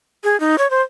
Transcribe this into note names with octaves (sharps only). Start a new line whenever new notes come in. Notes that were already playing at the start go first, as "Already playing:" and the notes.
G#4
D#4
C#5
C5